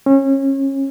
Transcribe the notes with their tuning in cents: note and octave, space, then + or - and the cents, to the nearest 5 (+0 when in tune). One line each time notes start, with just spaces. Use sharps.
C#4 -25